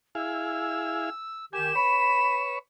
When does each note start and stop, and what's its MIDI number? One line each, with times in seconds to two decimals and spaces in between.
0.15 1.10 64
0.15 1.10 68
0.15 1.10 77
0.15 1.45 88
1.53 1.72 51
1.53 1.72 67
1.53 1.72 80
1.53 2.55 100
1.75 2.59 71
1.75 2.59 73
1.75 2.38 83